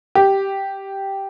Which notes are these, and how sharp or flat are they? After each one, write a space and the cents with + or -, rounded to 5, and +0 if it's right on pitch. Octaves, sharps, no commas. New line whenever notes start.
G4 -5